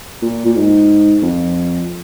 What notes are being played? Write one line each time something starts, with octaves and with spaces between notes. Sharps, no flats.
A#2
A#2
G#2
F2